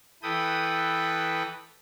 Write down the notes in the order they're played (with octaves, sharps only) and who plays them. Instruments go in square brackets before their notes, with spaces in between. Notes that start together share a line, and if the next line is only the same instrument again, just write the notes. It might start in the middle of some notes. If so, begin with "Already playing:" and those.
[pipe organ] E3 A4 B4 G5 D#6